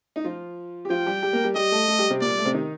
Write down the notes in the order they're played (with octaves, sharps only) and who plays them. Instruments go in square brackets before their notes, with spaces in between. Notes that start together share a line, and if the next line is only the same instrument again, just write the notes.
[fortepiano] D#4
F3 F4
G4
[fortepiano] F3 F4 [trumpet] G5
[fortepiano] G3 G4
G3 G4
A#3 A#4
G3 G4
[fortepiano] G3 G4 [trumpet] D#5
[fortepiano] A3 A4
A3 A4
G3 G4
C3 C4
[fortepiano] A#2 A#3 [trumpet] D5
[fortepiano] G3
A2 A3
C3 C4
D#3 D#4